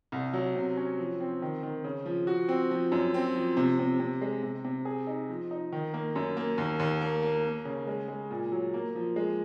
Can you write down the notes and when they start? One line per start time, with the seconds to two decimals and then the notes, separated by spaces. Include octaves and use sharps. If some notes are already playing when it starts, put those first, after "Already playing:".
0.12 C2
0.33 F#3
0.55 C3
0.77 C#4
0.98 F3
1.20 C4
1.42 D#3
1.63 D#3
1.84 C#3
2.06 F3
2.27 F#4
2.49 C4
2.71 F3
2.92 F#2
3.14 C4
3.35 F3
3.57 C3
3.79 C3
4.00 C3
4.21 G#3
4.43 C3
4.64 C3
4.85 G#4
5.07 D#4
5.29 F3
5.51 D#4
5.72 D#3
5.94 A#3
6.16 F#2
6.37 A#3
6.58 D#2
6.79 D#2
7.01 A#3
7.23 A#3
7.45 A#3
7.65 C#3
7.87 G#3
8.08 G#3
8.31 A#2
8.52 F#3
8.74 A#3
8.95 F3
9.16 G#3